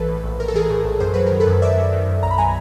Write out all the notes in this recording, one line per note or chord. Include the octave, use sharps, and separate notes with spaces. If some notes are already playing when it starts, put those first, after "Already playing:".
Already playing: A#1 E3 A4 B4
A2
A#1
A#1 A#4
A4
E3 G#4 A#4
A2
A#1
F#2 C5
F#3 B4
A#4
D#3
A4 B4
F#2
F#2 D5 E5
F#3
D#3
F#2
B1 A#5
B5
F#3 G#5 A#5